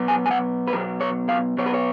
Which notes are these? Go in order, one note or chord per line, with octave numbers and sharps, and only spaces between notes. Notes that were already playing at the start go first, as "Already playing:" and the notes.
Already playing: B2 F#3 B3
G#5
G#5
F#5
B4
B2 F#3 B3 A#4
C#5
F5
B2 F#3 B3 C#5
B4
C#5